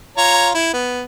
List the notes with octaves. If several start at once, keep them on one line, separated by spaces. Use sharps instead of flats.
F4 C#5 A#5
E4
B3